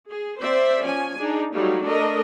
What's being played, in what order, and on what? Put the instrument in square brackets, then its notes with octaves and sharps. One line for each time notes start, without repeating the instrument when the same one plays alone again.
[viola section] G#4
C4 C5 D5 E5
F3 C#4 G#5
D4 D#4 G#4
F#3 G3 A3 D#4 F4
A3 D4 A4 A#4 D#5